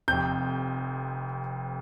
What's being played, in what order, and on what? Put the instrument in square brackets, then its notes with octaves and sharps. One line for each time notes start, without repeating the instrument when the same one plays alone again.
[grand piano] F1 F2 C3 G6